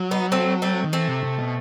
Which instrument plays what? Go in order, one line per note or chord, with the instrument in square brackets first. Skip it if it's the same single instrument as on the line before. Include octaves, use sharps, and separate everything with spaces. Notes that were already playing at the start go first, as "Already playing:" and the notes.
Already playing: [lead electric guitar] F#3
[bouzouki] B3 D#4
A3 C4
A3 C4
[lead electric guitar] D#3
[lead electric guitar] E3 [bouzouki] A3 C4
[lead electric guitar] C3
C3
B2